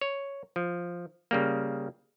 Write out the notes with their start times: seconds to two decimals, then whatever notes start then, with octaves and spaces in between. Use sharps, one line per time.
0.01 C#5
0.56 F3
1.31 C#3 G3 A#3